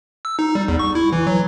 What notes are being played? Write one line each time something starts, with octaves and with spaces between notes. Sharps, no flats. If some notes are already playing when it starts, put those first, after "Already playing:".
E6
D#4
G3
E2
C#6
E4
E3
F#3